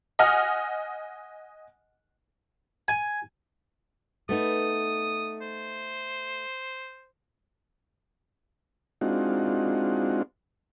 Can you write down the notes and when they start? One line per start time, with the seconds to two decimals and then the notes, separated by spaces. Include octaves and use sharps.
0.19 D#5 F#5 G#5 D#6 F6
2.88 G#5
4.29 A3 B3 D#4 D#6
5.41 C5
9.01 G#3 C4 D4 D#4 F4 F#4